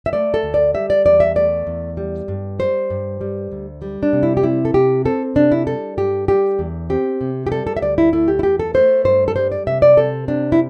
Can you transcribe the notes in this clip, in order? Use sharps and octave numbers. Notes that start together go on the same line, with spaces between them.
E5
A3 D5
A4
D2
D5
G3 E5
D5
E2 D5
E5
A3 D5
E2
G3
G2
G3 C5
G2
G3
D2
G3
D4
C3
E4
G4
C4 E4
A4
C3 G4
C4 A4
C3 D4
E4
G3 A4
G2 G4
G3 G4
E2
C4 G4
C3
G4
G3 A4
A4
E5
D2 D5
E4
A3 E4
G4
E4
E2 G4
A4
A3 C5
G2 C5
A4
G3 C5
D5
C3 E5
D5
C4 A4
C3 D4
E4